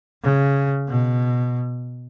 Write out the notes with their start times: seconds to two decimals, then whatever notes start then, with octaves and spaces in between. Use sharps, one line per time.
0.23 C#3
0.89 B2